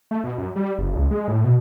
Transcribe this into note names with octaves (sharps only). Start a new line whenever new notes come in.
A3
B2
F#2
G3
F#1
C#2
G#3
A2
B2